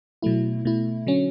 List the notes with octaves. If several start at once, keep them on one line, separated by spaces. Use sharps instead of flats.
B2 F#3 A3 E4
B2 A3 E4
D3 F#3 C#4